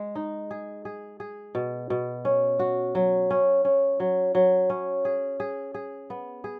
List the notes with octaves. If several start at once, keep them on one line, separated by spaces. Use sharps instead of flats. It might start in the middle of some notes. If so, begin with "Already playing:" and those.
Already playing: G#3
D#4
G#4
G#4
G#4
B2
B2
C#4
F#4
F#3
C#4
C#4
F#3
F#3
C#4
G#4
G#4
G#4
B3
G#4